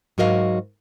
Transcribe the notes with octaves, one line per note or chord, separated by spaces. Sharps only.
G#2 F#3 F#4 A#4 D#5 F5